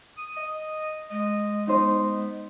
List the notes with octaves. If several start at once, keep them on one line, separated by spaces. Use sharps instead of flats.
D#6
D#5
G#3 D#5
B3 D#4 C5